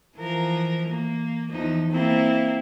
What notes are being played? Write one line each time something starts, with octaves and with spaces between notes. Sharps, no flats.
E3 F3 A#4
A#3
E2 F3 D#4
A#3 C4 E4